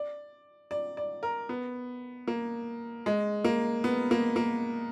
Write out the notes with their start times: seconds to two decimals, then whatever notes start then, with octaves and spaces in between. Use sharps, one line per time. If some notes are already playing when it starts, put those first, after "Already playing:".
Already playing: D5
0.71 D5
0.97 D5
1.23 A#4
1.49 B3
2.28 A#3
3.06 G#3
3.44 A#3
3.84 B3
4.11 A#3
4.36 A#3